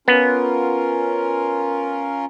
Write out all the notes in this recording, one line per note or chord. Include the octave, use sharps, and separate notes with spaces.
B3 C#4 F4 A#4